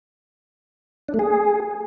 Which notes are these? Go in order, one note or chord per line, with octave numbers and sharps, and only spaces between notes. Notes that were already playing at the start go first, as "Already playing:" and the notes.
D4
A3
G#4